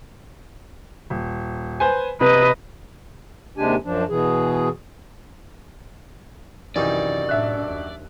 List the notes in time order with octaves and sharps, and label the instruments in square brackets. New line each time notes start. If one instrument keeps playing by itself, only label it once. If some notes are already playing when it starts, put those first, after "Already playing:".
[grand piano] D#1
B4 C5 G#5
[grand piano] C3 [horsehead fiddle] B4 D#5
[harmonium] D#2 C3 G#3 D4 G4 G#5
F#2 F3 D4
B2 E3 G#4
[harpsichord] F#2 G3 D#4 [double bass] C3 D#3 [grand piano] E3 [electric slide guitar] D5
[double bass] A2 D4 [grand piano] E5 F#6
[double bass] D#2